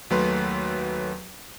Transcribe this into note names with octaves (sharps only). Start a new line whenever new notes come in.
D#2 F#3 A3 B4 C6